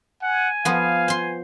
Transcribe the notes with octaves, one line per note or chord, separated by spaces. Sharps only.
F#5 G#5
F3 B3 F5
C5 C6